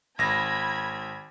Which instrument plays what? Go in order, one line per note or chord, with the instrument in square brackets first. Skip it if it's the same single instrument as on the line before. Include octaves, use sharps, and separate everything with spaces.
[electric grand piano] G#1 A#6 [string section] B5 G#6